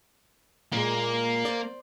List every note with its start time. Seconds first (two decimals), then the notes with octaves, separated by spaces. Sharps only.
0.72 A#2 G#3 A#3
1.45 C5 D5